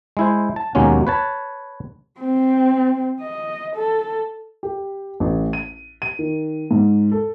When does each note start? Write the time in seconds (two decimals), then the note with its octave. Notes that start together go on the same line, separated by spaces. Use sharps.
0.17 G#3 E4 C5
0.56 A5
0.75 D#2 B2 F#3 G#3 A#3 C#4
1.07 B4 C#5 A5
2.20 C4
3.21 D#5
3.76 A4
4.63 G4
5.20 A1
5.53 D#7
6.02 D#7
6.19 D#3
6.71 G#2
7.12 A4